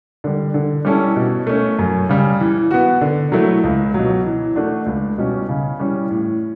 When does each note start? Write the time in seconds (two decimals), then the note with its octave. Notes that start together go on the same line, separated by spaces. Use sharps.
0.24 D3 G3
0.54 D3
0.85 G3 C#4 E4 A4
1.16 B2
1.47 A3 C#4
1.79 F#2
2.09 C#3 G3
2.40 E3
2.71 B3 F#4
3.01 D3
3.32 F#3 A3 E4
3.63 C#2
3.94 B2 F#3
4.25 E3
4.56 A3 D4 F#4
4.86 C#2
5.18 B2 G3 C#4
5.49 C#3
5.79 E3 G3 C#4
6.11 A2